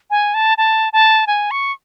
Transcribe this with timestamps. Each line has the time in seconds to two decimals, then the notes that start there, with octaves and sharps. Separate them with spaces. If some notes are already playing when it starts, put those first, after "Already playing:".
0.10 G#5
0.34 A5
0.58 A5
0.93 A5
1.27 G#5
1.51 C#6